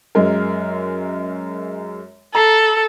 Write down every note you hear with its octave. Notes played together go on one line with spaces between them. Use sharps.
F#2 G#3 A#4
A4 A#5 C7